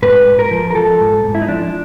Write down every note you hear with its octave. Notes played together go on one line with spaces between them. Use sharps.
G#2 B4
G#2
A#4
F3
A#4
F3 A4
G#2
G#2
E4
D#4
F3 D4